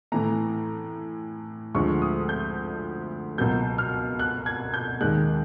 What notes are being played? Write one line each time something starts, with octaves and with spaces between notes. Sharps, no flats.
A2 E3 A3 A#5
D2 D3 F3 G#3 C#6
D#6
G6
C#2 B2 F#3 A#3 G6
F6
F#6
G#6
G6
D#2 D#3 G#3 F#6